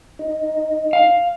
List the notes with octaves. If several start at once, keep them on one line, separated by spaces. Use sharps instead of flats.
D#4
F5